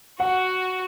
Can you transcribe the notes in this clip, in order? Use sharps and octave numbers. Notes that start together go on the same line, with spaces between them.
F#4 F#5